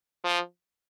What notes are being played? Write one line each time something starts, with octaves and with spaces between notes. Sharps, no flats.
F3